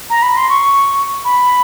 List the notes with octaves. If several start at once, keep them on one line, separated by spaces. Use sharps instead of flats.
A#5
B5
C6
C#6
B5